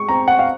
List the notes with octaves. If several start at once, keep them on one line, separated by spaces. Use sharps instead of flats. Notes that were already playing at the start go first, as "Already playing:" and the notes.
Already playing: G#3 C#6
C4 A#5
F#5
F5